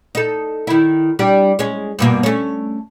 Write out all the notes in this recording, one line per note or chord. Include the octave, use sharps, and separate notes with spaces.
D#4 A4
D#3 E4
G3 D4 G4
G#3 C#4
G2 B2 A#3
A3 C#4